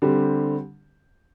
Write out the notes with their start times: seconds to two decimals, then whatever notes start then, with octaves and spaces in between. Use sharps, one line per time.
0.02 D3 G3 C4 G4